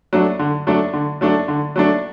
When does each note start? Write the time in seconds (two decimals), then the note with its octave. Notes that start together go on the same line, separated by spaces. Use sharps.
0.13 F#3 A3 D4
0.39 D3
0.67 F#3 A3 D4
0.93 D3
1.21 F#3 A3 D4
1.48 D3
1.76 F#3 A3 D4